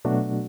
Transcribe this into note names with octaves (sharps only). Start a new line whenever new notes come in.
B2 F#3 A3 D4 F#4